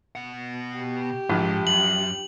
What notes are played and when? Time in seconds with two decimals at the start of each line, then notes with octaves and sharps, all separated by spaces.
0.15 B2 F#5
0.77 G4
1.30 A#1 G#2
1.67 F#2 F#7